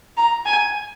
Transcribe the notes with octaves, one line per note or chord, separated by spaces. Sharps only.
A#5
G#5